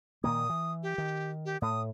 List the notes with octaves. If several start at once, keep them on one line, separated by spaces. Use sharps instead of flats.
A#2 D#3 A#3 D#6
E3
G4
D#3
G4
A2 D#6